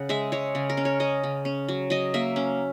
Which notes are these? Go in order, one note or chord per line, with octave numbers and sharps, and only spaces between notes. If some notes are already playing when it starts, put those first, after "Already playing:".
Already playing: C#3 F#5
G#3 E5
G#3 C#5
C#3
A#4
C#4
C#5
C#4 D#5
C#3
C#4
F#3
F#3 D#5
A#3 E5
C#4